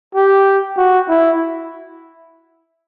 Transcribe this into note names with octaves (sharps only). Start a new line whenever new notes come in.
G4
F#4
E4